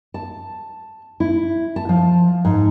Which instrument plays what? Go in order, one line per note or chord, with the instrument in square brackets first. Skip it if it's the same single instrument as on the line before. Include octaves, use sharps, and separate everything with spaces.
[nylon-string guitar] A5
E4
A5
F3
G#2